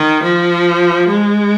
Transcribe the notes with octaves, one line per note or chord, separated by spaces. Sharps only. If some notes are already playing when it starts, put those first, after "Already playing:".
Already playing: D#3
F3
G#3